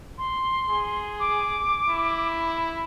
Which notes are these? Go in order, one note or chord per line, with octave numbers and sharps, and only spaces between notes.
C6
G#4
D6
E4